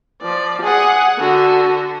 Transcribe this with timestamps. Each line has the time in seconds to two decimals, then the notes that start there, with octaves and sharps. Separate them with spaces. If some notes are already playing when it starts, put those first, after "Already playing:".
0.22 F3 D5
0.62 G#4 F#5
1.18 D3 F#4